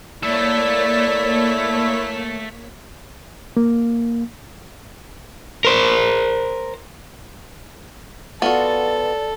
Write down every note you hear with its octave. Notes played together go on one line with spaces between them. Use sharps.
A3 A#3 E4 A4 C#5 D5 B6
A#3
A#4 C5
B3 F4 F#4 A4 D5